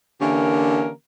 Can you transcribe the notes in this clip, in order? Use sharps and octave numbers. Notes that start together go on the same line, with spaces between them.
D3 E3 A#3 C#4 G4 A#4